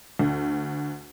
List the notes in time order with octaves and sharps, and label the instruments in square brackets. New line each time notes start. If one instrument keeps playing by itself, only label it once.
[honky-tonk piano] D2